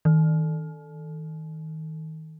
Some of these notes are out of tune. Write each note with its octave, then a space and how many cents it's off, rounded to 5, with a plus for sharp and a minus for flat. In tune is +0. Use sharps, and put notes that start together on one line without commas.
D#3 +25